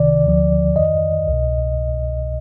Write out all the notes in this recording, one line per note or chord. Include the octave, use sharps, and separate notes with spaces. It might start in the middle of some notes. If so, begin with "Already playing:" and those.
Already playing: C2 C3 D#3 D5
D2 D3 F3
F2 D#3 D#5
C2 B2